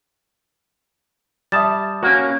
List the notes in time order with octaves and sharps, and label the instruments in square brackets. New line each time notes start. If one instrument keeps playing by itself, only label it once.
[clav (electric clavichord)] G3 A5 [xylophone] E5 D#6 A6
[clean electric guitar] A#3 [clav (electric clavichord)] C#4 F#4